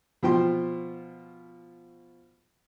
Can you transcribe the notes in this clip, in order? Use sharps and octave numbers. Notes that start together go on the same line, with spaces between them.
B2 F3 G5 C6